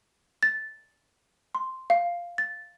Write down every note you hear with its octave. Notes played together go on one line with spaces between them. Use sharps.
A6
C6
F5
A6